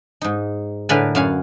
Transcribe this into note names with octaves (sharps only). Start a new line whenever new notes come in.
G#2 D#4
A2 D3 A#4 B4 G#5
F#2 F#4 F5 G#5